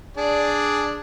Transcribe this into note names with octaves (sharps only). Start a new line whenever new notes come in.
D4 G#4 D5